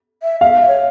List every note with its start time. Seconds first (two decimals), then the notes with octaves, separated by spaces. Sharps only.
0.23 E5
0.41 E5 F5
0.61 E5
0.68 C#5